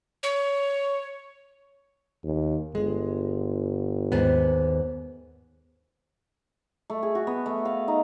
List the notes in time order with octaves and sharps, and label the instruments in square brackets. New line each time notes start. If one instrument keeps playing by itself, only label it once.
[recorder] C#5
[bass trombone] D#2
[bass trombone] G1 [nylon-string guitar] G#3
[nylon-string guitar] D#2 G#2 B3
[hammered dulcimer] A3
G#4
F#4
B3
A3
F5
D#4